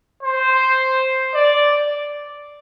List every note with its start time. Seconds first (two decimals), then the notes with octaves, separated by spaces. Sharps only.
0.23 C5
1.34 D5